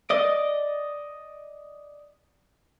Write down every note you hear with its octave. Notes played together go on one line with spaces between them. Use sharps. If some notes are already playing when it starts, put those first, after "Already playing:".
D5 D#5